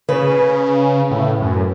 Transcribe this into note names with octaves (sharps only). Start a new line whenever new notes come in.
C#3 B4
A2
F#2